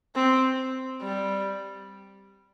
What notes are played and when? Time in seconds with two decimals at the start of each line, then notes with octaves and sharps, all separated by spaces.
0.15 C4
1.02 G3